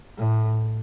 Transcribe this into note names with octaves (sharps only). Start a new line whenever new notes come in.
A2